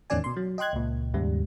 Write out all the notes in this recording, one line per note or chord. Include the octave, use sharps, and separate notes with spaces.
E2 A2 D#3 C#4 D5 G#5
B2 C6
F#3
D#5 G5 C6 F#6 G#6
C#2 A#2
D#2 G#2 C#3 G3